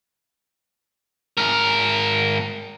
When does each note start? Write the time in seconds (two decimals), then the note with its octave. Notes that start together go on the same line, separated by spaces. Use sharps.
1.37 G#2 A#4